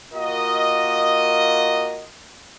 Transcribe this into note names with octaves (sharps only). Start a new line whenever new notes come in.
A#3 F4 F#4 A#4 D#5